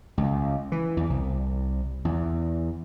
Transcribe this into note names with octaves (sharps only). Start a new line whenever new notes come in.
C#2
E3
E2
C2
E2